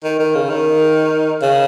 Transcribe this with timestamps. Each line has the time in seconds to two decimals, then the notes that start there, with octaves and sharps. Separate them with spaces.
0.04 D#3
0.19 D#3
0.35 C#3
0.50 D#3
1.42 C#3